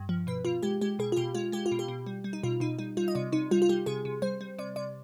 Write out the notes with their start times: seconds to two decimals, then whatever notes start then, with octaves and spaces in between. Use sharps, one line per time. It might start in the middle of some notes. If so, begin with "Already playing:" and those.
Already playing: G2
0.09 F3
0.27 B2 B4
0.45 B2 F4
0.63 G#3 G4
0.81 G#3 G4
0.99 B2 G#4
1.12 F4
1.16 B2 G4
1.35 G#3 F4
1.52 G#3 G4
1.66 F4
1.72 B2
1.79 G4
1.88 B2
2.07 G3
2.24 G3
2.33 D#4
2.44 B2 F4
2.60 B2 D#4
2.79 G3 D#4
2.97 G3 F4
3.08 D#5
3.15 C3 D5
3.32 C3 D#4
3.51 G3 F4
3.62 F4
3.69 G3 G4
3.86 C3 G#4
4.05 C3
4.22 G3 C5
4.41 G3
4.59 C3 D5
4.76 C3 D5